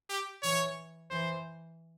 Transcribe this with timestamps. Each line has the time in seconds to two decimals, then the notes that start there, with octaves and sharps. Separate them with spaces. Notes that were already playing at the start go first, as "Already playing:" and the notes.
0.09 G4
0.43 E3 C#5
1.11 E3 C5